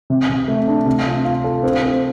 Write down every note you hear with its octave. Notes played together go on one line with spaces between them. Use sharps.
C3
C3
A3
D4
C3
F4
F4
A4
C4
C4